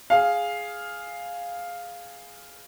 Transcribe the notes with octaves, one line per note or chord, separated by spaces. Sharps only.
G#4 F5